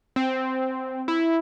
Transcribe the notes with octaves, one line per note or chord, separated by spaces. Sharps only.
C4
E4